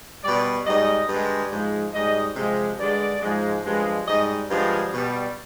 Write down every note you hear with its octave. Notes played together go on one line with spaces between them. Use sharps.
B2 G3 D5
G#2 G3 D#5
G2 D3 G#3
G#2 F3 G#3
G#2 G3 D#5
C3 F3 G#3
G2 D3 G#3 D5
G#2 F3 G#3
G2 F3 G#3
G#2 G3 D#5
G2 D3 F3 G#3 F5
B2 G3